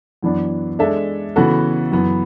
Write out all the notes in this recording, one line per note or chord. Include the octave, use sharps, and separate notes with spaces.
F#2 E3 B3 D4
G#3 D4 A4 E5
C#3 E3 B3 F#4 A4
F#2 E3 B3